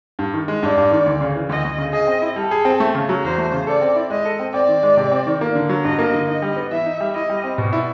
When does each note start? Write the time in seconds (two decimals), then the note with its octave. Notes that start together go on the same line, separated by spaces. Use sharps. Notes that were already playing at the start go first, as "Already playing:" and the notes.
0.19 G2
0.34 D#3
0.48 G#3
0.63 G2 D5
0.78 G2
0.91 D#3
1.06 D2
1.21 C#3
1.36 E3
1.49 D2 D#5
1.64 D2
1.78 C#3
1.93 G#4 D#5
2.07 C4
2.22 E4
2.36 G3 A4
2.51 G#4
2.65 C4
2.80 A3
2.95 C#3
3.09 F#3
3.23 E2 C5
3.38 A3
3.52 C#3
3.67 A4 D5
3.82 C4
3.96 E4
4.10 G#3 D#5
4.25 A4
4.40 C4
4.54 C4 D5
4.68 D#3
4.83 G#3
4.97 C3
5.12 C4
5.27 D#3
5.41 A#3
5.55 D3
5.69 F#3
5.84 G2 D#5
5.99 A#3
6.13 D3
6.28 D#4 D#5
6.42 G3
6.57 B3
6.71 E3 E5
6.86 D#4
7.00 G3
7.15 E4 D#5
7.29 G3
7.44 C4
7.58 B2 D5
7.73 E4